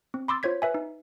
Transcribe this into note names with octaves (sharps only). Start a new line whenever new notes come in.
C4
B5 C6 D6 E6 A6
F4 C5 C#5 G#6 B6
B4 E5 G#5
D#4